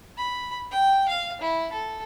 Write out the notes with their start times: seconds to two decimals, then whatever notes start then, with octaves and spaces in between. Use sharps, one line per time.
0.17 B5
0.71 G5
1.08 F5
1.41 E4
1.72 A4